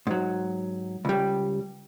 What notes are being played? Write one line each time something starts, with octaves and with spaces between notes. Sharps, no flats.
G#2 F#3
C#2 G3